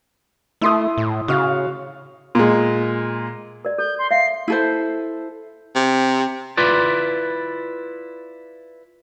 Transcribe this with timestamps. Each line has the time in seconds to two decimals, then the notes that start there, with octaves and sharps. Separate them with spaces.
0.61 A3 E4 C6 D#6
0.98 A2
1.28 C#3 F#4 F5
2.35 A#2 G#3
3.65 A#4 D5
3.78 A4 G6
3.99 C6
4.11 E5 F5 C7
4.48 E4 A4 C5
5.75 C3
6.57 E4 F4 B4 D5